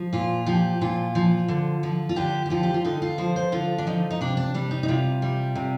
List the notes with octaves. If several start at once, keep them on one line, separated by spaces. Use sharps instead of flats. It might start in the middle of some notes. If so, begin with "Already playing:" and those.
Already playing: F3
A#2 F4
F3 G4
A#2 F4
F3
D3
F3
F4
D3 G4
G4
F3 F4
G4
F4
D3 D#4
F4
F3 C5
C5
D3 F4
D4
F3 D#4
D#4
C3 D4
D4
G3 D4
D#4
D#4
C3 F4
G3
C3